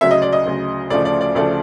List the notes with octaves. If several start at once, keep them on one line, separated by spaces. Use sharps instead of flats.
D2 C#3 F#3 E5
D#5
D5
D#5
D2 C#3 F#3
D2 C#3 F3 A3 D5
D5
D5
D2 C#3 F3 A3 D5